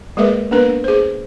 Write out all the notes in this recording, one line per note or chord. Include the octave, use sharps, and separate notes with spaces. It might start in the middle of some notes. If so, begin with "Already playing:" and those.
G#3 A#3 G#4 A#4 B4 E5
A#3 B3 D4 A#4 B4
G#4 C5